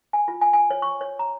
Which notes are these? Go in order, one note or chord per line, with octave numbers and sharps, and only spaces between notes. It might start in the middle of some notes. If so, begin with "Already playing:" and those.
G#5
F4
G#5
G#5
C#5
C#6
C#5
A#5